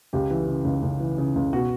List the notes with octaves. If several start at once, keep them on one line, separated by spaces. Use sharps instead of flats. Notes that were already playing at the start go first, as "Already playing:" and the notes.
C#2 G4
E3
C#3
C#2
C#2
E3
C#3
C#2
B2 F#4